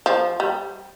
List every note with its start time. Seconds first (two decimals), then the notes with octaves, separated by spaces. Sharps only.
0.06 F3
0.40 G3